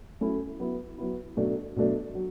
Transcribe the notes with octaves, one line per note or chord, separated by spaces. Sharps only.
F#3 A3 C#4 E4
F#3 B3 E4
F#3 B3 E4
B2 F#3 A3 D4
B2 F#3 A3 D4
F#3